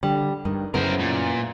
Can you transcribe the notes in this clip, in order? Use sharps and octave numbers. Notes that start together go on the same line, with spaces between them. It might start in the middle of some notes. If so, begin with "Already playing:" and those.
D3 G3
G2 D#3
F#2 C#3 B3 E4 A#4 C5
A#2